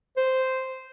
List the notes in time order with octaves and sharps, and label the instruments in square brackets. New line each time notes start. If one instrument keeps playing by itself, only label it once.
[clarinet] C5